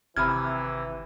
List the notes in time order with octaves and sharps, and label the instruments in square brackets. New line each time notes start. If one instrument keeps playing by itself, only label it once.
[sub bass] G#1 [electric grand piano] C3 G#6 [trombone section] E3 [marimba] B5 F6